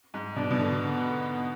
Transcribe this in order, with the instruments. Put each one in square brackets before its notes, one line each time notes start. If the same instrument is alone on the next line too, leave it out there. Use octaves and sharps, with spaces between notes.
[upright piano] G#2
[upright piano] B2 [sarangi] D4
[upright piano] B2
D3
[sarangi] B3